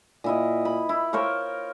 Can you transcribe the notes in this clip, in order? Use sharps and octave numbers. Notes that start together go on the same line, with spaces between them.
A#2 E4 D#5
B5
E4
A#4 C5 C#5 F5